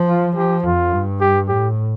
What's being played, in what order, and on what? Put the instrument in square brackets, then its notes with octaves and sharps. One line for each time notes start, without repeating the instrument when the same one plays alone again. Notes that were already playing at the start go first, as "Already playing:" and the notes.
Already playing: [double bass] F3
[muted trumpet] F4
[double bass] F3 [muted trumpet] G4
[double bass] F2 [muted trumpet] F4
[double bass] G2
[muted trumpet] G4
[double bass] A2 [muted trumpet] G4